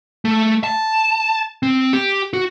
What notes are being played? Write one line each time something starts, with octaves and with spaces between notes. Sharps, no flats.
A3
A5
C4
G4
F#4